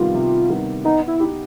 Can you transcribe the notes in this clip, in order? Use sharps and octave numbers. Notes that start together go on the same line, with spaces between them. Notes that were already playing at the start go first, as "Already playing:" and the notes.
Already playing: C3 D#3 G3 B3 F4
C3
D#3 G3 B3
B3 D#4
E4
D#4 G4